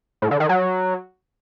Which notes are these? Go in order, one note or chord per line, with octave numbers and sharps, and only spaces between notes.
A2
D3
D#3
F#3